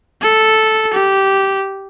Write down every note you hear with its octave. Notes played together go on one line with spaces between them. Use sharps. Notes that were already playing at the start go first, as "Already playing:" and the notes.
A4
G4